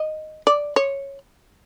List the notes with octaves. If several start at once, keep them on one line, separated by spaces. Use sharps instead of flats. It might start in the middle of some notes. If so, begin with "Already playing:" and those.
Already playing: D#5
D5
C#5